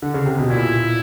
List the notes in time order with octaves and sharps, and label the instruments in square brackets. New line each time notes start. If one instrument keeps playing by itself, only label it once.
[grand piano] D3
C#3
C3
B2
[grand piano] A#2 [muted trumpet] E4